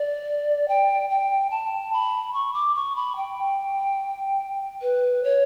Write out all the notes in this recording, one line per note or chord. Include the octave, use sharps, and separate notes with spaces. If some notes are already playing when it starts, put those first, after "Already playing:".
Already playing: D5
G5
G5
A5
B5
C#6
D6
C#6
B5
G5
B4
C#5